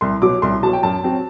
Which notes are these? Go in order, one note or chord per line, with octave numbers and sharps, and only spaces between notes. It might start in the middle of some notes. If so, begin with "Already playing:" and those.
C2 C6
B2 F#3 D6
C2 C6
B2 F#3 A5
G5
F#2 A5
F#3 C4